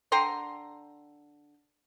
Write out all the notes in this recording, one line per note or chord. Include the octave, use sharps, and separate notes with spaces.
D3 G5 A#5 C6